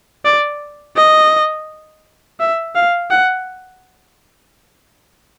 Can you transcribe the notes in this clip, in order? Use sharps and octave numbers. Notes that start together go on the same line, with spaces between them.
D5
D#5
E5
F5
F#5